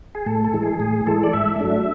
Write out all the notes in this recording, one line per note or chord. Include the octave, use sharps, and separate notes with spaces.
G#4
A2 A4
A4
E3 G#3
G#4
A2 G#4
E3 G#3 A4
D5
G#2 E5
F#3 A3 D4